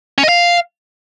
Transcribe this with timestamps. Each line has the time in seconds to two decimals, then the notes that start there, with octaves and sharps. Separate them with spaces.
0.18 C#4
0.23 D#5
0.29 F5